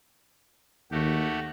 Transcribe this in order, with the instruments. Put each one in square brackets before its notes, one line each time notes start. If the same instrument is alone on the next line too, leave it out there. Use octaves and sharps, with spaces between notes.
[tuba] D#2 [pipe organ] A3 F#4 G4